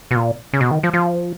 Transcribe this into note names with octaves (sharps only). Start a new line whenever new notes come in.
B2
A#2
C#3
B2
D#3
F3
F3